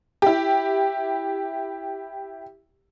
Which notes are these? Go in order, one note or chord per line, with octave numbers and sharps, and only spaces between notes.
E4 G4